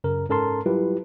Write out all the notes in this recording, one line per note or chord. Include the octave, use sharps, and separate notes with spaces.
F#2 C#3 A#4
G#2 C#4 A4 A#4 A5 C6
F#3 G3 E4 F4 G4 B4